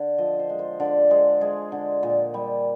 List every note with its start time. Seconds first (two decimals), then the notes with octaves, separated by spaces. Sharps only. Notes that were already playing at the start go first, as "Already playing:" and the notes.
Already playing: D3
0.18 F3 D#5
0.39 C5
0.50 G#3
0.59 C5
0.80 D3 D5
1.11 G#3 C5
1.41 G#3 G#4
1.72 D3
2.03 A#2
2.34 G3